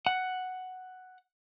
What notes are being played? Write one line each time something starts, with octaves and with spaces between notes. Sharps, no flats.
F#5